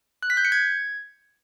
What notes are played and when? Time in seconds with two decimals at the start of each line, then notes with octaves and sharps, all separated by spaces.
0.23 F#6
0.30 B6
0.37 G6
0.45 C#7
0.52 G#6